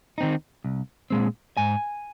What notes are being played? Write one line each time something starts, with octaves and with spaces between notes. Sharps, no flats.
D#3 C4 D#4
C2
A#2 G#3 C4
G#2 G#5